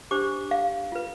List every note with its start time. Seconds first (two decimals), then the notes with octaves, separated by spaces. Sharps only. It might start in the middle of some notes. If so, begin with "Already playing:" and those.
0.11 D4 G4 C5 D6
0.51 F5
0.92 F4 B4